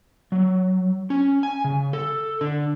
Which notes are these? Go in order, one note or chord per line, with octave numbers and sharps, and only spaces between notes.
F#3
C#4
G#5
C#3
A4
D3